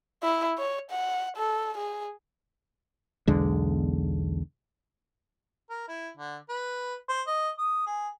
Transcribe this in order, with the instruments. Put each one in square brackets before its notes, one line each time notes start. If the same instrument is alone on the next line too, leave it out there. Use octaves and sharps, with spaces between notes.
[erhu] E4
C#5
F#5
A4
G#4
[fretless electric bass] B1 E2 D3 G#3
[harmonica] A#4
E4
D3
B4
C5
D#5
D#6
G#4